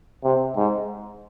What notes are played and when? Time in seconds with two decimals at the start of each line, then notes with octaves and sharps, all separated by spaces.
0.24 C3
0.56 G#2